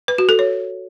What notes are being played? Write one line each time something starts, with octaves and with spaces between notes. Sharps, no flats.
B4
F#4
A4
C#5